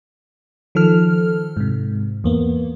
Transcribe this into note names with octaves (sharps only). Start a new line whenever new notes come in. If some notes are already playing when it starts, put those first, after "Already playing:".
D#3 F3 A4 F6
G#2 C3
E2 A#3 B3